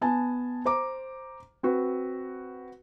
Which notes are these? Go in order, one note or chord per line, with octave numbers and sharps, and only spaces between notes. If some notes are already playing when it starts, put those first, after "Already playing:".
B3 G#5 A5
C5 A#5 D6
C4 F#4 B4